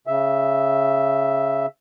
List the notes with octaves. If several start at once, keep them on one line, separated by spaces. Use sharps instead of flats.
C#3 E5